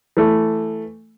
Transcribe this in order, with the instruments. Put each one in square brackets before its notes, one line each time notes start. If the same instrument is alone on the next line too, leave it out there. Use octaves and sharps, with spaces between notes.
[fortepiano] E3 A3